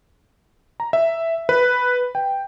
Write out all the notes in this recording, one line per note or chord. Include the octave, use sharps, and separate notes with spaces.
A#5
E5
B4
G5